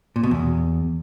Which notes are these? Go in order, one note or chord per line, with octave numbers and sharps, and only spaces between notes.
A#2
B2
E2